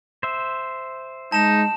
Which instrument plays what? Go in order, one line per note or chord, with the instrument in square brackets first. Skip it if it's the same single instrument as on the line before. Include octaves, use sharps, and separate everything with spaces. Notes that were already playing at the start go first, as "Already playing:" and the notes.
[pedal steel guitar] C5 E5
[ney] G#3 [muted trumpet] D#4 [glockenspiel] A5 E7